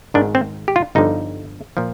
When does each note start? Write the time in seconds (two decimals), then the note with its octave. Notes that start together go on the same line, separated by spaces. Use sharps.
0.14 G#1 G#2 D#3 D4
0.35 C4
0.68 G4
0.76 F4
0.95 G1 G2 D3 F3 D#4
1.77 A#2 F3